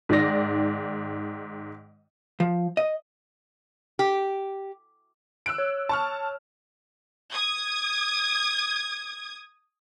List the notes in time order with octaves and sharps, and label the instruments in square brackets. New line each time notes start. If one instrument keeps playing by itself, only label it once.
[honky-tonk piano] G#2 D#3 D5 A#6
[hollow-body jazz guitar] F3
D#5
[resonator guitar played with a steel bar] G4
[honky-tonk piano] E6 F#6 D7
[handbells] C#5
[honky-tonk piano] A5 C#6 F6
[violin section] D#6 G#6